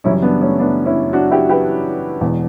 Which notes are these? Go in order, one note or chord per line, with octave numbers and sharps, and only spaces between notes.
F#1 F#2 E3 G3 C#4 E4
B3 D4
A3 C#4
B3 D4
C#4 E4
D4 F#4
E4 G4
G4 B4
E1 E2 B2